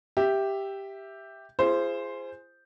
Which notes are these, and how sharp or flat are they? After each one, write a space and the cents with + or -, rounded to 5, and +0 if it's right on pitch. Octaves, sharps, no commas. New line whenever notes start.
G4 +0 E5 +0
F4 -45 G#4 +0 C5 +0